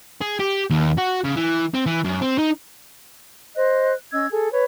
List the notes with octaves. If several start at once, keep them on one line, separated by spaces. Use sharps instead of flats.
G#4
G4
D#2
F#4
C#3
E3
C4
E3
F#2
C4
D#4
C5 D#5 F#6
C#4 D#5 E6 G#6
G#4 A4
B4 C#5